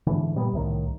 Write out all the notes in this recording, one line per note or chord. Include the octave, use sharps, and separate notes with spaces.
G#2 D3 E3
A#2 G3 B3
C2 A2 D#3